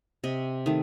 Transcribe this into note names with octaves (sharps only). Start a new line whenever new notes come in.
C3 D#5
D#3 A3